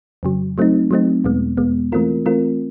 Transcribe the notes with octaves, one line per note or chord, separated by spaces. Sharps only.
F2 C#3 F#3
F#3 A3 C4 D#4
F#3 A3 C4 D#4
E2 B2 G#3 B3
E2 B2 G#3 B3
E3 A3 C4 F4 A#4
E3 A3 C4 F4 A#4